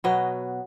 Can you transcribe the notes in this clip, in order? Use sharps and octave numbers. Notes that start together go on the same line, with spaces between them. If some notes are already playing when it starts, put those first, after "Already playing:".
B2 F#3 B3 D#5